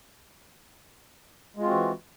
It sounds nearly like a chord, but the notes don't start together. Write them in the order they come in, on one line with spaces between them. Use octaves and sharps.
G#3 F4 C4 F#4 E3